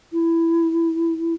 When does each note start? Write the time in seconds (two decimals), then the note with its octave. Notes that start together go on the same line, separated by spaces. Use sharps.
0.13 E4